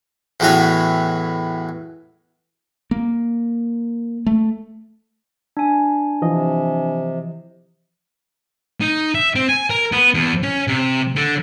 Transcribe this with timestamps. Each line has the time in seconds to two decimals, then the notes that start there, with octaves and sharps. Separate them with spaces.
0.40 E2 A2 E3 F#3 F#4 C#5
2.91 A#3
4.26 A3
5.57 D4 G#5
6.22 C3 E3 F3 D#5
8.81 D#4
9.15 E5
9.35 C4
9.49 G#5
9.70 A#4
9.92 B3
10.14 E2
10.43 C#4
10.68 C3
11.16 D3